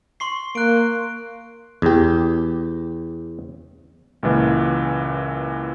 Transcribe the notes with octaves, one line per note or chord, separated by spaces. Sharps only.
C6 C#6 C7
A#3 F#6 D7
E2 G4
C#2 A#2 E3